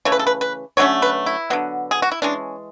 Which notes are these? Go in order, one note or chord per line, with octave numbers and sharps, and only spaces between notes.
C#3 E3 A3 C#5
B4
A4
B4
B4
D3 F#3 A3 C#4 C#5
B4
E4
D3 F#3 B3
G#4
F#4
E4
E3 G#3 C#4 D4